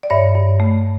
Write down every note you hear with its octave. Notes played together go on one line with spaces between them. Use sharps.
D5
G2 C#5 E5
G2
A3